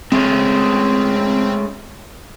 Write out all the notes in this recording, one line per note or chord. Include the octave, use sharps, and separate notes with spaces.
G#3 A3 C4 C#4